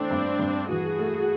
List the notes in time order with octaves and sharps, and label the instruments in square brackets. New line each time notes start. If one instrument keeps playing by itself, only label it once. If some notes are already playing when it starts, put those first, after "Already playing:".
Already playing: [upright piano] E3 A3 [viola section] C4 D4
[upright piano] G2
G2
[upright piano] E3 [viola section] F#4 G#4
[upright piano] A3